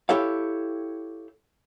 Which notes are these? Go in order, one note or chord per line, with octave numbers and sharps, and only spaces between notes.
E4 G4 A4 C#5 F5